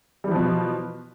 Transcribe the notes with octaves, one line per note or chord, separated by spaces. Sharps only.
B2 E3 F3 G3